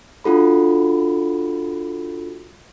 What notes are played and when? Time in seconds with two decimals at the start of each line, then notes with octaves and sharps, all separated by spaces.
0.24 D4 F4 F#4 A4 B5